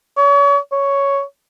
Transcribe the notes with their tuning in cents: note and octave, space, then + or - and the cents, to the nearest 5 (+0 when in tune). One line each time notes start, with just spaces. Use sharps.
C#5 +35
C#5 +5